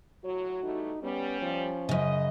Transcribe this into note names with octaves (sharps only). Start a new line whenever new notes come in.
A2 F#3 F#4 C#5
E3 G3 A3 D#4
G3 B3 C#4
F3
F#2 C#3 D#5